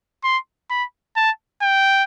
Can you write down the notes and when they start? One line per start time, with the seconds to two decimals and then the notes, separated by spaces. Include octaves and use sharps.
0.24 C6
0.70 B5
1.17 A5
1.62 G5